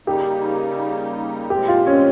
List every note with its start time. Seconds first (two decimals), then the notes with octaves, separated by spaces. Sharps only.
0.06 C#3 G3 A#3 D#4 G4
1.50 A#2 F3 G#3 C4 G4
1.68 F4
1.87 C#4